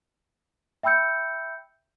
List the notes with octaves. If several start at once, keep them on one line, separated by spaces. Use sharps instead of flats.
E5 G5 B5 E6 G6 C#7